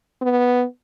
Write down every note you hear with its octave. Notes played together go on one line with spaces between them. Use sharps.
B3